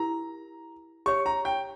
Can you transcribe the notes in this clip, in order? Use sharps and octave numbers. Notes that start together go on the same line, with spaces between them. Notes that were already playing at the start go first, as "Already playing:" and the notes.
Already playing: E4 G4 A#4 A#5
G4 C#5 E5 C#6
A#5
G5